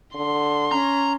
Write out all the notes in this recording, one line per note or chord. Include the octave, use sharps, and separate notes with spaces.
D3 C6
C#4 A#5